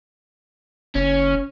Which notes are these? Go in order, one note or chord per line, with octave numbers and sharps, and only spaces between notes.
F#1 C#4